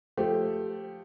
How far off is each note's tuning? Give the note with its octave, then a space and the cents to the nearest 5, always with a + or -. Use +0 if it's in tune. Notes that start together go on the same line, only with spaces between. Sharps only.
F3 +15 A3 +0 G4 -5